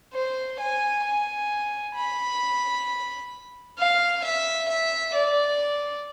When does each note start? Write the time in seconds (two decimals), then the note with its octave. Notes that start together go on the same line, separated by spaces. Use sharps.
0.13 C5
0.60 G#5
1.04 G#5
1.96 B5
3.78 F5
4.24 E5
4.69 E5
5.14 D5